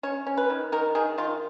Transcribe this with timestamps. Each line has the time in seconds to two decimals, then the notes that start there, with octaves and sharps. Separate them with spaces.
0.03 C#4 C#5
0.27 C#4
0.37 B4
0.50 D#3
0.72 D#3 A#4
0.95 D#3 G#4
1.18 D#3 F4